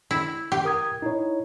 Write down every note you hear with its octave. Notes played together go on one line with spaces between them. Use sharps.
E4
G4
A#4 D#6 G#6
D#4 E4 C#5